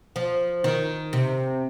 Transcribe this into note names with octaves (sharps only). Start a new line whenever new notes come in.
F3
D#3
C3